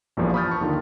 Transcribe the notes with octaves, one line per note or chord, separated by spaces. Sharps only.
A#1 E2 G2 A#2 F3
B5 C#6 D#6 F6 G6 A6
A5 C#6
D#2 D3 D#3 F4